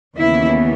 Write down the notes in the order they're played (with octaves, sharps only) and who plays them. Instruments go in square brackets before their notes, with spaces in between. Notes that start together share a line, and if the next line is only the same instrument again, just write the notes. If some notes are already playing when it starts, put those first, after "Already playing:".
[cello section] D#2 C#3 E3 B3 E4